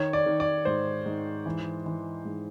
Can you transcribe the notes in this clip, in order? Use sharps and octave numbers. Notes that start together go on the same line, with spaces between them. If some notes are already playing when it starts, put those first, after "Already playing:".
Already playing: D#3 C#5
D5
D#3
D5
G#2 C5
G#2
E3
E3
G#2